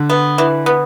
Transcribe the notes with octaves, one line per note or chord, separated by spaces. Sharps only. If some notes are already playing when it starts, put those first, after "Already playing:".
Already playing: D3
B3
E3
B3